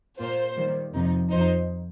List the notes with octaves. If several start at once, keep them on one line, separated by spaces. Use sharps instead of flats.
A#2 A#3 F4 C5
D#3 G3 A#3
F2 C3 F3 D#4
F2 F3 D#4 C5